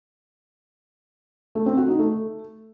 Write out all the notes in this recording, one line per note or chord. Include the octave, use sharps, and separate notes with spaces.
A3
C4
F#4
D#4
A3